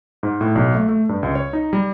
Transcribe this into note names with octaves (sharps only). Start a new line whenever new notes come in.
G#2
A2
B1
A3
A3
G2
C#2
C#5
D#4
G3